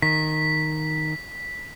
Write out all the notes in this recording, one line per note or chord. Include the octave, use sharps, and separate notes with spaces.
D#3 B6